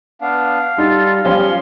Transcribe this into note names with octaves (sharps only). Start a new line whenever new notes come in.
B3 D4 F5
G3 D#4 F4 A4
F3 G3 C#4 F4 C6